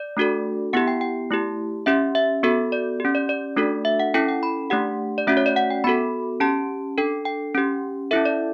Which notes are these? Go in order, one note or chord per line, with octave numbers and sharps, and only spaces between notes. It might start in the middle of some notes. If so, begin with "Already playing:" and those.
Already playing: D5
A3 D4 F#4 A4
B3 E4 G4 F#5
G5
G5
A3 E4 G4
C#4 G4 E5
E5
B3 F#4 A4 E5
D5
C#4 G4
D5
D5
A3 D4 F#4 A4
E5
F#5
C#4 E4 A4 G5
G5
B5
A3 D4 G4 F#5
D5
A3 C#4 F#4 E5
C#5
D5
F#5
G5
B3 F#4 A4 B5
C#4 G4 A5
D4 A4 G5
G5
C#4 G4
C#4 E4 A4 E5
D5